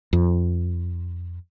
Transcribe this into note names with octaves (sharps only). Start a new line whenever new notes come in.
F2